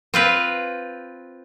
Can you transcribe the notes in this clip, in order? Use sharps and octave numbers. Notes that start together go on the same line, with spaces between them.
C4 F4 B4